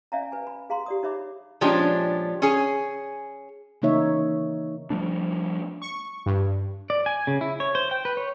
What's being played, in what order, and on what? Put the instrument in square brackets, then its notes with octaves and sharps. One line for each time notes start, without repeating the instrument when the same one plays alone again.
[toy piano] C#4 D5 E5 F5 G#5 A#5
B4 G#5
B5
G#4 F5 A#5 C6
G4 D5 D#6
D#4 C#5 E5 B5 D6
[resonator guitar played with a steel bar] A#2 F3 G#3 C#4 D4 G4
C#4 G#4
[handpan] C#3 E3 A#3 D#4 C#5 E5
[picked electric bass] F3 G3 A3 D4
[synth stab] C#6
G2
[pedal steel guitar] D5
G#5
C#3
E4
C#5
C5
G5
B4
C#5